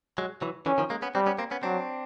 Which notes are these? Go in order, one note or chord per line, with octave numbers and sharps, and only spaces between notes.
F#3 G#3
E3 F#3
D3 E3 C#4
D#3 F3
G#3 A#3
B3 C#4
G3 C4 D4
B3 C#4
A#3 C4
B3 C#4
F#3 C4 D4